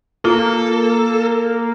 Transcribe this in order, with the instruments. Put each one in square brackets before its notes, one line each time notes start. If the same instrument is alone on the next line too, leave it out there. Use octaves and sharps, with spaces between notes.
[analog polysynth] A#3 [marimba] F4 [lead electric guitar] A4